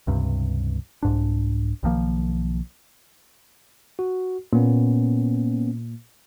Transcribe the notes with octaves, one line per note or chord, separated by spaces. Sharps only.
C#2 G2 C3
C2 G#2 D4
B1 D#3 F3 A#3
F#4
A#2 A#3 B3 C#4